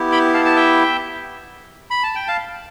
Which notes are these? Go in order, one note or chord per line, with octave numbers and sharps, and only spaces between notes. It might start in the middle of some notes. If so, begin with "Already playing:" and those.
Already playing: B3 E4 G4
G5 B5
F5 A5
A5
E5 G5
B5
A5
G5
F5 A5